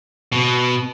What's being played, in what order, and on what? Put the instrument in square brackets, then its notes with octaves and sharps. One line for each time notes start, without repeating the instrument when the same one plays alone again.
[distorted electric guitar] B2